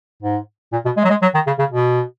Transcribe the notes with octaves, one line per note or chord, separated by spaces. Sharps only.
G#2
A#2
B2
G#3
F#3
G#3
F#3
D#3
C#3
C#3
B2